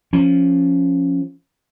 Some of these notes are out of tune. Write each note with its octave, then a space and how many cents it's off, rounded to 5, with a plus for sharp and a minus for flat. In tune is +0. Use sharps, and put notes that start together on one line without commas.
F3 +0 C#4 +0